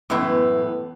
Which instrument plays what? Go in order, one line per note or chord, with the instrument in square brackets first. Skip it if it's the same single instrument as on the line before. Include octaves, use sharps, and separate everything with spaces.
[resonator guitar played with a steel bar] F#2 A2 [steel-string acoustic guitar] E3 B3